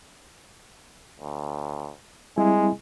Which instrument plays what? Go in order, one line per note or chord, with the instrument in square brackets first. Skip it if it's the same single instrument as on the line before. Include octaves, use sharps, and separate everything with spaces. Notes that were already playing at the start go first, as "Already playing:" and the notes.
[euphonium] D2
[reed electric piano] G3 C4 E4 [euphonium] G#3